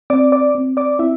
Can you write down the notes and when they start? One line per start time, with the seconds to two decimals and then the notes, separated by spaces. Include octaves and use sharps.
0.10 C4 D5 D6
0.32 D5 D6
0.55 C4
0.77 D5 D6
0.99 C4 E4 E5